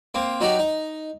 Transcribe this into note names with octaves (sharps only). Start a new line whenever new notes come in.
A#3 C4
F#3 D#4 F#4 G4
D#4